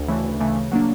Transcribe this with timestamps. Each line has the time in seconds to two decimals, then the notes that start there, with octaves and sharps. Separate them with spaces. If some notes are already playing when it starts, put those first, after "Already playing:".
Already playing: D2
0.08 C#3 E3 A3
0.24 D2
0.40 C#3 E3 A3
0.56 C#3
0.72 F#3 A#3 D4